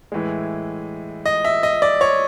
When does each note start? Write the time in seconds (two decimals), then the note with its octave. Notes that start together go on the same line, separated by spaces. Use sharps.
0.12 A2 E3 G#3
1.26 D#5
1.45 E5
1.63 D#5
1.82 D5
2.01 C#5